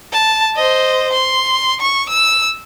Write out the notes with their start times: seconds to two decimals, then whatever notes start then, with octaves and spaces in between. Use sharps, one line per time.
0.13 A5
0.56 C5 D#5
1.12 C6
1.80 C#6
2.09 E6